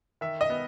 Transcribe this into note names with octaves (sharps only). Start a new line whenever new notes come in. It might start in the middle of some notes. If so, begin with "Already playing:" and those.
D#3 E5
D#5
B3